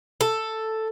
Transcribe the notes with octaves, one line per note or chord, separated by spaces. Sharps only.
A4